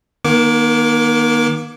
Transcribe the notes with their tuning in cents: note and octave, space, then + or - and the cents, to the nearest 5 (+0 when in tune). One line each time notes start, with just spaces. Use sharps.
D#3 -10 A#3 +40 D6 -15